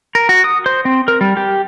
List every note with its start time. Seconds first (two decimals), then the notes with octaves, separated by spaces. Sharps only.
0.15 A#4
0.29 F#4
0.44 D#6
0.66 C5
0.85 C4
1.08 A#4
1.21 G3
1.37 G4